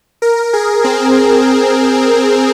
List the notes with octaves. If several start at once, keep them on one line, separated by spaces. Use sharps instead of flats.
A#4
G#4
C4